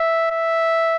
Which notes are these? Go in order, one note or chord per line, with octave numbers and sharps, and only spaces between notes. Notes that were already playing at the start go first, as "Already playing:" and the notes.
Already playing: E5
E5